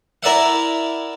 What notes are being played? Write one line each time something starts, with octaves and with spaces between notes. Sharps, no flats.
E4 A#4 D5 E5 F#5